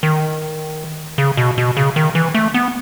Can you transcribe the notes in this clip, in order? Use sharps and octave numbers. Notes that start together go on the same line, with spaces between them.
D#3
C#3
B2
B2
C#3
D#3
E3
A3
B3